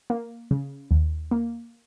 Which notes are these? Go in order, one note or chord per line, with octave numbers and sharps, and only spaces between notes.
A#3
C#3
D#2
A#3